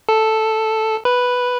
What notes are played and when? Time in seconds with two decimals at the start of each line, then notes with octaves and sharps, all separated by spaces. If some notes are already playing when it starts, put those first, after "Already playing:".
0.09 A4
1.05 B4